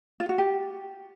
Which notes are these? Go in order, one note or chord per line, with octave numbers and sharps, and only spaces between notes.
F4
F#4
G4